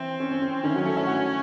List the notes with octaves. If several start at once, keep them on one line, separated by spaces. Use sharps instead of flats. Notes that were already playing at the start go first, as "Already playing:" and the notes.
Already playing: E3 C4 E4
C#4
C#4
C#4
D#3 C#4 D#4
E4
F#3 F#4
A3 A4
E4 E5
F#4 F#5